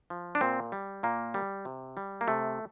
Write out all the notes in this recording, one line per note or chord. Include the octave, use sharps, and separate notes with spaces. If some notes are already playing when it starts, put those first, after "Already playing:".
F3
D4
A#2 C4
G3
A#2 A#3
G3
C3
G3
A#3
C3 A3